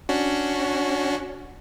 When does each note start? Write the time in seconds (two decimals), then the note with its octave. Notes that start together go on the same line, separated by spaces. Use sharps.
0.09 C#4 D4 F#4